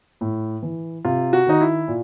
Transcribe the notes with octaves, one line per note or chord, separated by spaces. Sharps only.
A2
E3
C3 F4
F#4
D#3 D#4
E4
A#2